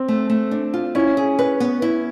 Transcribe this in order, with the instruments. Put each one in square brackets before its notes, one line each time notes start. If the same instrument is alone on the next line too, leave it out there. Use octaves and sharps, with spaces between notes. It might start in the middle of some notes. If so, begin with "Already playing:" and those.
Already playing: [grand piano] C4
[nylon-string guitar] A3
A3
D4
F4
[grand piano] C#4 [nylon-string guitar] E4
[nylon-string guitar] G#4
B4
B3
E4